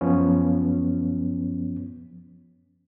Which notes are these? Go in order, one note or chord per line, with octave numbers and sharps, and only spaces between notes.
F#2 F3 B3 C#4